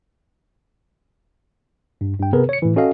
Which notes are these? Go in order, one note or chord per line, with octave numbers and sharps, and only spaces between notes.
G2
G2 G5
C3 B3 G#4 A#4 B4
C#5 C#7
A2 E3
C#4 F#4 A4 D#5 F5